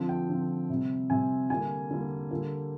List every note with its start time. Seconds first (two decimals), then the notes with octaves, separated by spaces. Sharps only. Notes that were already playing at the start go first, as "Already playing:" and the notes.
Already playing: D3 F3 C4
0.09 G5
0.29 D3 F3 C4
0.70 C3 G3 C4
1.10 C3 G3 C4 G#5
1.50 D3 G3 A#3 G#5
1.90 D3 G3 A#3
2.31 D3 G3 A#3